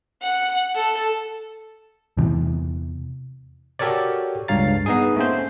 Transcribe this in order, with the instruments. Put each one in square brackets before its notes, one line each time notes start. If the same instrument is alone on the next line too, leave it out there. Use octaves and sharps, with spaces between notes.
[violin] F#5
A4
[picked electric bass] E2 C3 E3
[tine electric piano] F#4 G4 A4 A#4 C#5 D5
C#2 G2 C#5 F5 A#5 A6
B3 D#4 G#4
A3 A#3 C#4 C5